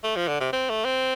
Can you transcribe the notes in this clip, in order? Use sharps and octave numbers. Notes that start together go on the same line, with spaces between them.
A3
F3
D3
C3
C4
A3
C4